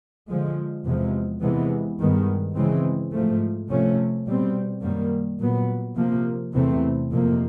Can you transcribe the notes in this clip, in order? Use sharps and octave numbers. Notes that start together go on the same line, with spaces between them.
D3 F3 G#3
E2 C3 F3 G#3
C3 E3 G#3 B3
G2 D#3 G#3 B3
C#3 E3 G#3 C4
G#2 F3 A3
C3 F3 A3 C#4
B2 G3 C4
F#2 D#3 G3 A#3
A#2 F#3 B3
C3 F3 A#3
E2 C3 E3 A3 C4
F2 C3 F3 A#3